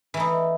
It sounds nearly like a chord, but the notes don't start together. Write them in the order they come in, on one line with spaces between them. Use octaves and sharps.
E3 A3 D#4